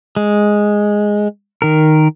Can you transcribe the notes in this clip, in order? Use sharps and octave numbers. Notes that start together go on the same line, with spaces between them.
G#3
D#3 A#4